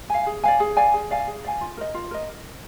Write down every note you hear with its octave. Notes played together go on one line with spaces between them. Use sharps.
F5 G#5
G#4
D5 F5 G#5
G#4
D5 F5 G#5
G#4
D5 F5 G#5
G#4
D5 F5 G#5
F4
A#4 D#5
F4
A#4 D#5